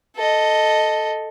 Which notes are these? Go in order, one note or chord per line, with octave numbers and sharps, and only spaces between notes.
A4 D#5